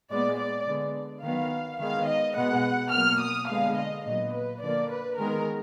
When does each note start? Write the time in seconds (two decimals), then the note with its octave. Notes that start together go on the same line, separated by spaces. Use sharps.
0.11 A#2 G#3 B3 D5
0.39 D5
0.68 D3 G#3 B3
1.24 D#3 F#3 B3 F5
1.80 D#3 G#3 B3 F5
2.08 D#5
2.36 B2 G#3 B3 F#5
2.93 B2 F#3 A#3 F6
3.22 D#6
3.50 D3 G#3 B3 F5
3.78 D#5
4.06 A#2 F#3 B3 D#5
4.34 B4
4.62 D3 F3 A#3 D5
4.90 B4
5.18 D#3 G#3 B3 A#4